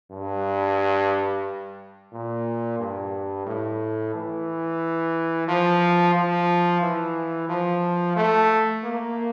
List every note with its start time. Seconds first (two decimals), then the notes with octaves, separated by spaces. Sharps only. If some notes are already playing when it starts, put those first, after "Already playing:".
0.11 G2
2.12 A#2
2.79 G2
3.46 A2
4.14 E3
5.48 F3
6.15 F3
6.82 E3
7.49 F3
8.16 A3
8.83 A#3